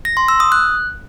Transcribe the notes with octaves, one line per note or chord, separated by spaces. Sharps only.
A#6
C6
E6
D#6
F#6